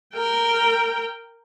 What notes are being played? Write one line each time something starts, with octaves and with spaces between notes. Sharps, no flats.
A#4 G5